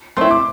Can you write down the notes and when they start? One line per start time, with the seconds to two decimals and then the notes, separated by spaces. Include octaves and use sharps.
0.17 A3 C4 E4 C6
0.31 D6